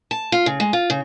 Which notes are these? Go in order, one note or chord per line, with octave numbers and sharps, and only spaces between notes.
A5
F4
C#3
G#3
F4
C#3